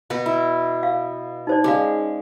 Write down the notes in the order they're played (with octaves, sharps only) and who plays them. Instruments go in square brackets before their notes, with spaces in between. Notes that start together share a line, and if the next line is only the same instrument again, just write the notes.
[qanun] B2 F#4 B4
E4
[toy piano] F5
D#4 C5 D5
[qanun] G#3 C#4 [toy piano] G#4 D5 F5